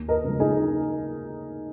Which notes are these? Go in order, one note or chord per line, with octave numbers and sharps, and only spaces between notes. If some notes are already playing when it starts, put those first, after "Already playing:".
Already playing: D#2
A#4 D#5
C#3 F3 G#3
D#4 G#4